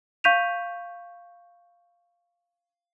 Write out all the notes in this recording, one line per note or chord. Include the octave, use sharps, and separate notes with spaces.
F5 C#6 G6 B6 D#7 F7